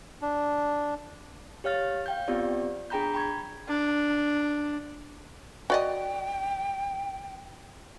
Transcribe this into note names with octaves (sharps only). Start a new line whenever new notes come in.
D4
G4 C#5 F5 F6 A6
F5 G5 G6
B3 C4 F4 G4 D5
D4 G#4 G5 A#5 B5 G6
G5 B5 C#6 G#6
D4
F#4 D5 D#5 G5